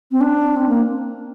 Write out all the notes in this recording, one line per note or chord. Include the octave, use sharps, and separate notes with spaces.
C4
D4
C4
A#3